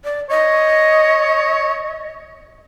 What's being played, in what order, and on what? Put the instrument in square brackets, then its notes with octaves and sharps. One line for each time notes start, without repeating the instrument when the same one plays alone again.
[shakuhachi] D5
[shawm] C#5 [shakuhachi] D#5